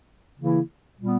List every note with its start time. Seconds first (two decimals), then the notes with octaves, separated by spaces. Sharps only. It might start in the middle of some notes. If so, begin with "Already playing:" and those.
0.40 C#3 E3 A#3 E4
0.99 A#2 G3 B3